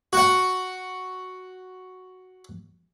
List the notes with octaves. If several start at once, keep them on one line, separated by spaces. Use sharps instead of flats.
F#4 F#5